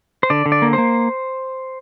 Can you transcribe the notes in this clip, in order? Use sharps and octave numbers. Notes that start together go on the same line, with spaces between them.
C5
D3 D5
D3
D5
A#3
A#3 C5